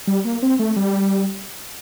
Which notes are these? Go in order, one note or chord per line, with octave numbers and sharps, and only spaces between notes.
G3
A#3
C4
A3
G3